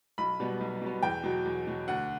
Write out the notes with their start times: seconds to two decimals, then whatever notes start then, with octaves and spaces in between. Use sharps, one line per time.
0.18 B1 B5
0.40 B2 G3 B3
0.61 B1
0.82 B2 G3 B3
1.03 E2 G5
1.24 B2 F#3
1.46 E2
1.67 B2 F#3
1.88 D2 F#5